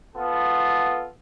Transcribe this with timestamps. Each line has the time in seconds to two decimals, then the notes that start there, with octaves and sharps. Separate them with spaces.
0.16 B3 F4 A4